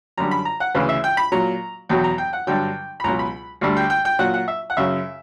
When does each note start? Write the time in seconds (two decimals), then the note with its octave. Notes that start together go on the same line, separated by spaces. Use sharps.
0.17 F#2 D3 G3 A#5
0.31 B5
0.45 A#5
0.60 F#5
0.75 D2 C#3 E3 B4
0.89 E5
1.04 G5
1.17 B5
1.32 A#2 F#3 A#5
1.89 E2 B2 F#3 G5
2.04 A#5
2.18 G5
2.33 F#5
2.47 G2 D3 F#3 G5
3.00 B5
3.04 C#2 B2 F#3 A#5
3.19 B5
3.61 D2 D3 G3
3.77 G5
3.90 G5
4.05 G5
4.19 A#2 F#3 F#5
4.34 F#5
4.48 E5
4.70 F#5
4.77 F#2 C#3 F#3 E5